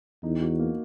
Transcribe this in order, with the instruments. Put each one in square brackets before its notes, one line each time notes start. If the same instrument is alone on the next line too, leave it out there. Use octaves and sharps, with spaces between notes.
[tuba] E2 [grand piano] D#4
[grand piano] F#4
A#3